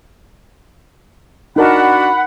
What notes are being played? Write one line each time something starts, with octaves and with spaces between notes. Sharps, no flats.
D4 D#4 F#4 A#4 F#5 A5 B5